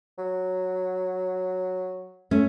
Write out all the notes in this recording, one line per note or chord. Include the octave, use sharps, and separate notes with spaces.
F#3
A3 C#4